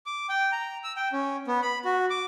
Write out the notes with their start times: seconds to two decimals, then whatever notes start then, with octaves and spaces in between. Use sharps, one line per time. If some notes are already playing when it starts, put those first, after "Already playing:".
0.06 D6
0.29 G5
0.52 A#5
0.84 E6
0.97 G5
1.12 C#4
1.47 B3
1.62 B5
1.85 F#4
2.10 D6